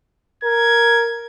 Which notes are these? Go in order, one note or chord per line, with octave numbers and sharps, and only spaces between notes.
A#4 G#6